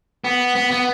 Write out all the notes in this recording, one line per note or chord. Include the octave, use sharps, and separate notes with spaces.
B3
B3
B3